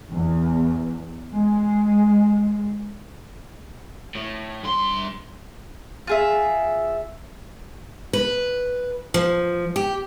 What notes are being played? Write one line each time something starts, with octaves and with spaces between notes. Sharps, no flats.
E2
G#3
A2
G2 C6
F4 G#4 E5
B4
F3
G4